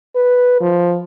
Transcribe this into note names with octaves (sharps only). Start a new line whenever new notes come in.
B4
F3